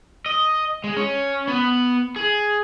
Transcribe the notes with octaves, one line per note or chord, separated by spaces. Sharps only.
D#5
G#3
C#4
B3
G#4